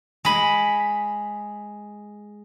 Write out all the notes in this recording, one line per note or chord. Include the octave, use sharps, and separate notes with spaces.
G#3 B5